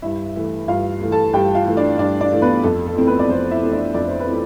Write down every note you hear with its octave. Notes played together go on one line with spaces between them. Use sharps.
G2 E4 E5
E3 A3
G2 F4 F5
E3 A3
A4 A5
G2 G4 G5
F4 F5
E3 A3
D4 D5
G2 D4 D5
D4 D5
E3 A3
B3 B4
F2 A4
A4
E3 A3 C4
B3 B4
D5
F2 C4 C5
E4 E5
E3 A3 C4
D4 D5
F2 D5
C5
B4
E3 A3 C4